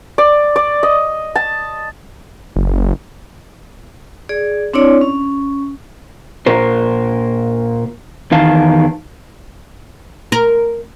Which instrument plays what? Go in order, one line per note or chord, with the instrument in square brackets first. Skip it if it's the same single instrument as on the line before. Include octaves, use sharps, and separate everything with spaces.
[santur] D5
D5
D#5
A5
[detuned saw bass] F#1
[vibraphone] G#4 D5
C4 D4 E4 C#5 D5
C#4
[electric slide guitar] A#2 A#4 C5
E2 D#3 F5 A5
[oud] A#4